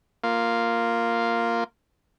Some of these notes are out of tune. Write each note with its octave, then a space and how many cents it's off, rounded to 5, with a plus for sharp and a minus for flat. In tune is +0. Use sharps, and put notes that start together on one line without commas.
A#3 -5 F4 +0